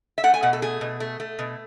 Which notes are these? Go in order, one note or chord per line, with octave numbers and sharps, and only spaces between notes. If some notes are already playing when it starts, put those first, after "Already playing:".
E5
A3 F#5
G#5
B2 F#5
A4
A3 G#4
B2
A3
A3
B2